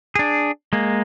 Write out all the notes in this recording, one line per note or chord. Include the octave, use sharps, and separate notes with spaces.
D4 G#4
G#3 A#3